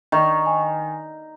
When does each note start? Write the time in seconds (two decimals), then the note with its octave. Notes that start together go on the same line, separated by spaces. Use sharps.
0.12 D#3 C#6
0.46 G#5